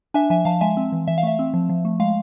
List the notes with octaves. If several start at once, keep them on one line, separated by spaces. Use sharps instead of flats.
D4 E5 G#5
F3 E5 G#5
F3 F5 A5
G#3 E5 G#5
C4
E3
E3 E5
F5
A3 E5
C4
F3
F3
A3
G#3 F5